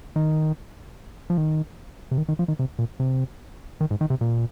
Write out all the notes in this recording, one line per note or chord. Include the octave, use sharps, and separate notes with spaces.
D#3
F3
D#3
C3
D#3
D#3
F3
D#3
C3
A#2
C3
D#3
G#2
D#3
C3
A#2